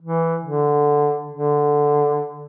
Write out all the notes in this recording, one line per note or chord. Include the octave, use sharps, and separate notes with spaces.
E3
D3
D3